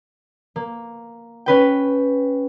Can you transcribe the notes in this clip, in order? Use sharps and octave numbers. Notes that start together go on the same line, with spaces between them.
A#3
C#4 B4 G5